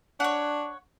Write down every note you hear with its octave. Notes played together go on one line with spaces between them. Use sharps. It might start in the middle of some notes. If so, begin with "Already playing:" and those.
D4 C#5 F#5